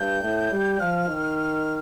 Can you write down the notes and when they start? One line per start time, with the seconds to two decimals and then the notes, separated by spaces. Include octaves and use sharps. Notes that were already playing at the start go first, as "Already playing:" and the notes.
Already playing: G2 G6
0.22 A2
0.51 G3
0.79 F3 F6
1.08 D#3